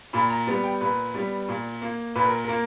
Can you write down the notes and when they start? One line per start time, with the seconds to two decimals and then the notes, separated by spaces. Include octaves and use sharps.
0.13 A#2 B5
0.30 A#5
0.47 G3 B3
0.64 G5
0.81 A#2 B4
1.14 G3 B3
1.49 A#2
1.82 A#3
2.15 A#2 B4
2.25 A#4
2.44 A#3 A#4